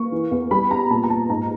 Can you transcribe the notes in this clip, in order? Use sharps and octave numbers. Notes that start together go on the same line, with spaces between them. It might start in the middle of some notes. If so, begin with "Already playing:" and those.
Already playing: A#3 C#6
E3
E2
G3 B5
B3 A#5
A#2 A5
A#5
A#2 A5
G#2 A#5